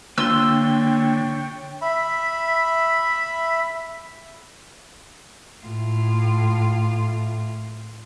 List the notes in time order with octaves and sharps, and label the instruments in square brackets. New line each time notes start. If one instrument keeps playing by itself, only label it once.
[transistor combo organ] D3 [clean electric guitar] A#3 F4 C6 [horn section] C#5 G5 [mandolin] E6
[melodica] E5 B5
[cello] A2 F4